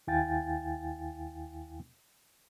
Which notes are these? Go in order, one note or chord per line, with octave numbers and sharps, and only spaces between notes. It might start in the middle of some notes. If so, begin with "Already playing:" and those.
D#2 E4 F5 G5 G#5 A6